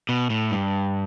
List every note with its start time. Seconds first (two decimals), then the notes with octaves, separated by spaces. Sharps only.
0.09 B2
0.30 A2
0.51 G2